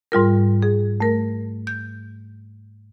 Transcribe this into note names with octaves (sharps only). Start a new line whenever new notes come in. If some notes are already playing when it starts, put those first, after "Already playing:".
G#2 G3 F4 A#4
G#4
A3 A#4
G6